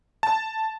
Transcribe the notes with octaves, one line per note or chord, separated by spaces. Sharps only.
A5